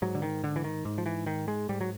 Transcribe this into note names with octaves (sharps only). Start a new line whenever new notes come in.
G#2 F#3
D3
D#3
D3
E3
D#3
G#2
F3
E3
D#3
G#3
G#2 G3
F#3